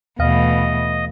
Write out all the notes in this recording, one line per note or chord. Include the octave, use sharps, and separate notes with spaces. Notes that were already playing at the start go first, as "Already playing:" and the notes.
D#2 B2 E3 A3 D#5 F5